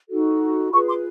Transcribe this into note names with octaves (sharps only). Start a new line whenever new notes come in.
D#4 F#4 A4
F4 G#4 B4 B5 C#6
C6 D6